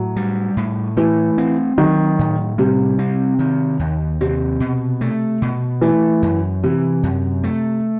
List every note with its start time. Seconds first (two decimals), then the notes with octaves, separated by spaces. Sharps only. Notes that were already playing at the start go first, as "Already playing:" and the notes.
Already playing: A2 F#3
0.16 G3
0.57 A2
0.97 E3 A3
1.38 C4
1.78 D#3 F#3
2.19 A2
2.58 C3 G3
2.99 C4
3.39 D#3
3.79 D#2
4.21 C3 C4
4.60 B2
5.01 A3
5.42 B2
5.81 E3 A3
6.22 F#2
6.63 C3 E3
7.03 F#2
7.44 A3